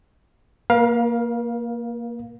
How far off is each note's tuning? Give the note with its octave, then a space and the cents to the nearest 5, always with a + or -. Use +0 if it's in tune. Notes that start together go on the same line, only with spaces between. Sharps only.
A#3 +0 A#4 +45 F5 +10